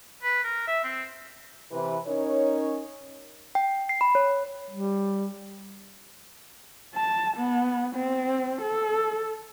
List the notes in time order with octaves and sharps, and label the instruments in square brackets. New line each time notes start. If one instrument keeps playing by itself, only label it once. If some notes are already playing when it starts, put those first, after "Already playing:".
[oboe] B4
A#4
E5
C4
[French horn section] C3 E3 B4
C#4 D#4 A#4 C#5
[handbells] G5
C7
B5
C#5
[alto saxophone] G3
[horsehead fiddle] A5
B3
C4
A4